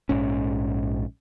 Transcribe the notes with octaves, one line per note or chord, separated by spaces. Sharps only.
A#1 G#2 C#4